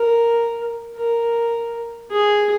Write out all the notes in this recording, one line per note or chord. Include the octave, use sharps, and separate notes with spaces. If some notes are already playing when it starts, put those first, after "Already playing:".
Already playing: A#4
A#4
G#4